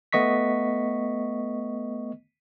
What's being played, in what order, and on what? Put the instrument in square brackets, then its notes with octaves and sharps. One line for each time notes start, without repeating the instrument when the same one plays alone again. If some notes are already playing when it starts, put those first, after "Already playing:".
[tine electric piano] A3 B3 D#5 C#6 B6